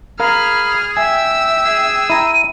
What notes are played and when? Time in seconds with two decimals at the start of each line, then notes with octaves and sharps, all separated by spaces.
0.20 G#4 A#4 F5 B5 F6
0.97 E5 G5 G#5 E6
1.64 G#4
2.10 E4 A#5 D#7